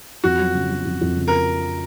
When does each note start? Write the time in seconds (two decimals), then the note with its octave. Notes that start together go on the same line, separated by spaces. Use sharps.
0.24 F2 F#4
0.39 F#3
0.55 C#3
0.70 F#3
0.85 F2
1.01 F2
1.16 C#3
1.28 A#4